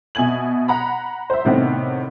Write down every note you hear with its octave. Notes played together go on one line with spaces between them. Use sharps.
B2 E5 G#5 G#6 F#7
F#5 A#5 B5
C5 E5
A2 C3 D#3 B3 C4